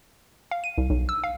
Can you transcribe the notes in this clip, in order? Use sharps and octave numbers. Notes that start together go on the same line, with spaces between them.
F5
D#7
C2
B1
E6
F5